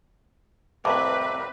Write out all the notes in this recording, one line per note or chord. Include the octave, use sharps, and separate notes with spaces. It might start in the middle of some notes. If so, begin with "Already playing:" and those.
C2 F2 A2 C4 B4 E5 A#5 D6